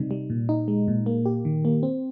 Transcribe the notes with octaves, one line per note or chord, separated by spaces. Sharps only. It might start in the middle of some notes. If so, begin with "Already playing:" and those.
Already playing: C3 G3 D#4
G3
A#2
D#4
G#3
A#2
A#3
G4
D#3
A#3
C4